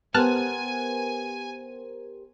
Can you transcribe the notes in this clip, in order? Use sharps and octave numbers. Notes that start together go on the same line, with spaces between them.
B3 G4 A#4 C5 G#5 A5 F6 F#6